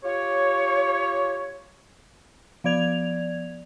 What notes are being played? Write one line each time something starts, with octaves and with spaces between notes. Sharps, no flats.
F4 G4 C#5
F3 B3 D5 G#6 F7